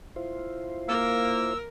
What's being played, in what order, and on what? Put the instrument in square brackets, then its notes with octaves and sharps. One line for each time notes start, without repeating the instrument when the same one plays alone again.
[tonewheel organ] E4 F4 C5
[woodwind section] A#3 [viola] A#4 [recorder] E6